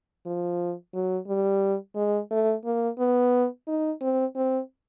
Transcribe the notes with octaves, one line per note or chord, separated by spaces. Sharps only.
F3
F#3
G3
G#3
A3
A#3
B3
D#4
C4
C4